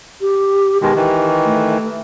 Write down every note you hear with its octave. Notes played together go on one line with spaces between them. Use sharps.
G4
B2 D#3 G#3 G4
D#3 E3
A3